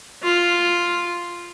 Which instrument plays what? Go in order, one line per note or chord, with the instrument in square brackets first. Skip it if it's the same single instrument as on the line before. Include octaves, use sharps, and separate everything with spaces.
[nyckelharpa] F4